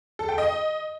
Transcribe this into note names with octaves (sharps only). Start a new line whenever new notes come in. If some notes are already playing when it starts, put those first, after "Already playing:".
A4
G5
D#5